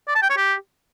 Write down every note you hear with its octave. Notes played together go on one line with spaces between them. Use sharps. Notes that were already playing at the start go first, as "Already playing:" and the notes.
D5
A5
G5
C#5
G4